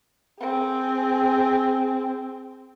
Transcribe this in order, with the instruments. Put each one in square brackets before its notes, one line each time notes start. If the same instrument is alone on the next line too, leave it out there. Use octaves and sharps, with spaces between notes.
[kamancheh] C4 G#4